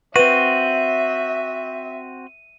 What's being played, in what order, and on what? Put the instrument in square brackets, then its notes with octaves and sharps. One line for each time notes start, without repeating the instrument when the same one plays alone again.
[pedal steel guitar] C4 F#4 [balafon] B4 [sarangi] E5 [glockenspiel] D#7